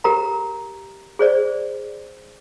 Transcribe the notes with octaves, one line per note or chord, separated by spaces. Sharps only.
G4 A#4 A#5
G#4 C5 D5